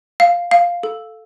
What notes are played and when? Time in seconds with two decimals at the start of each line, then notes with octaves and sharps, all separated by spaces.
0.20 F5
0.51 F5
0.83 A4